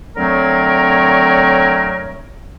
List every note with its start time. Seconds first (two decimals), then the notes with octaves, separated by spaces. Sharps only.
0.16 D3 F#3 A3 C4 A#4 C#5